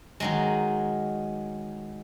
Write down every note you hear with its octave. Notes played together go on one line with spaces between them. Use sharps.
D#3 F#3 G#3